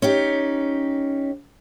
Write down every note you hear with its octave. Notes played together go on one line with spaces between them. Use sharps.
C#4 D#4 G4